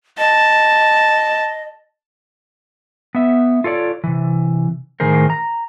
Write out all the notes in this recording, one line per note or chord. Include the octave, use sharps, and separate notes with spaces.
D#5 A5
B3 E5
F4 A4 C#5 D5
C3 E3
A2 D#3 G#4 A#4 C5
A#5